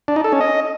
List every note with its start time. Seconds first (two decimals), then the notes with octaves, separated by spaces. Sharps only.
0.08 D4
0.16 D#4
0.24 A4
0.33 C#4
0.41 D#5